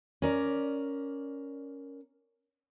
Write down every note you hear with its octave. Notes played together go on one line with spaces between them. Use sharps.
C#4 A#4 D5